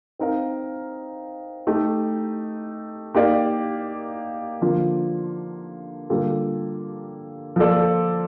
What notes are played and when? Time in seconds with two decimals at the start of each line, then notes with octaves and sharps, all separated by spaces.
0.19 C4 D#4 A#4 F5
1.67 A3 D#4 G4
3.15 A#3 D#4 G4 D5 F5
4.62 D3 F3 A#3 F4
6.10 D3 G3 A#3 F4 A4
7.56 F3 A#3 F4 A4 D5